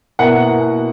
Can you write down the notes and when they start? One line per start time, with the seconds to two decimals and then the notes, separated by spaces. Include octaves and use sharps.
0.19 B2 A#3 E4 F#5